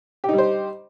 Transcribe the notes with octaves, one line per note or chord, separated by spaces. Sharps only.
G3 D#4 G4 C5